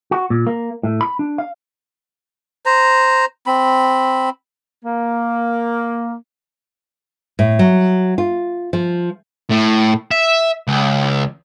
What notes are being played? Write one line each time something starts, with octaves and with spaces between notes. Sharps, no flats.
F#4
A#2
A#3
A2
B5
D4
F5
C5 A#5
C4 B5
A#3
A2
F#3
F4
F3
A2
E5
C#2